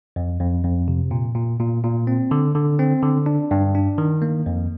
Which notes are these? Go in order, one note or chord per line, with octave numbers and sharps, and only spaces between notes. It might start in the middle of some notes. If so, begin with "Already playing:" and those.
F2
F2
F2
C3
A#2
A#2
A#2
A#2
C4
D3
D3
C4
D3
D4
G2
D4
D#3
A#3
F2